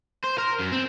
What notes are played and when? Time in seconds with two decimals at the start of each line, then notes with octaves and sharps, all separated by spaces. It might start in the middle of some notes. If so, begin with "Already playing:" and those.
0.24 C5
0.38 A#4
0.59 F#2
0.71 C4